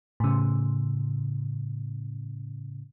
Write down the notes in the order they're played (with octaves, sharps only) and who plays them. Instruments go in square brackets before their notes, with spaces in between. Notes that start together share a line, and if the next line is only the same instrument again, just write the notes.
[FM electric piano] A2 C#3